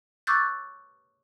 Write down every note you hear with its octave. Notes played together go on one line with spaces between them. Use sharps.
C#6 D6 E6 F#6 G6 A6